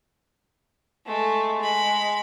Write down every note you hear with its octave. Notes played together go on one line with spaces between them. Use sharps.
G#3 A3
G#3 B5